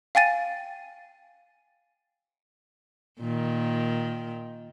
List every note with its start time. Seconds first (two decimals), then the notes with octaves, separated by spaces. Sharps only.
0.15 F5 G5 G#5 A6 D#7
3.20 A#2 D#3